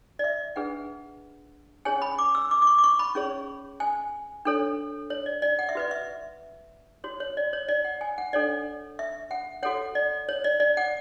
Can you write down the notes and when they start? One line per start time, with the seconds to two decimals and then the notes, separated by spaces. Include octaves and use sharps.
0.19 D5
0.24 E5
0.56 D4 G#4 B4 F#5
1.85 C#4 G#4 C#5 G#5
2.02 B5
2.19 D6
2.35 E6
2.51 D6
2.62 D6
2.67 C#6
2.78 D6
2.84 C#6
2.99 B5
3.15 C#4 G#4 C#5
3.80 G#5
4.45 D4 A4 C#5
5.10 C#5
5.26 D5
5.42 D5
5.59 F#5
5.69 E5
5.75 F#4 B4 D5
5.91 E5
7.04 F#4 C#5
7.20 C#5
7.37 D5
7.53 C#5
7.68 D5
7.84 F#5
8.01 G#5
8.18 F#5
8.33 D4 A4 C#5 D5
8.99 E5
9.31 F#5
9.63 F#4 A4 C#5 F#5
9.95 D5
10.29 C#5
10.44 D5
10.60 D5
10.77 F#5